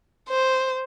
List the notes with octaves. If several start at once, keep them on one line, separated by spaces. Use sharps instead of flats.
C5